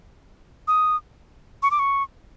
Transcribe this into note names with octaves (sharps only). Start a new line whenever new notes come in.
D#6
C#6
D6
C#6